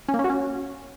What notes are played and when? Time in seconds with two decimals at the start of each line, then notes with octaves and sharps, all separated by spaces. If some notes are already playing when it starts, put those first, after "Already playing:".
0.08 C#4
0.14 A#3
0.19 C#4
0.24 F#4
0.29 C#4